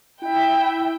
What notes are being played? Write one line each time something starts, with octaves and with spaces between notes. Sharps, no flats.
E4 E5 G5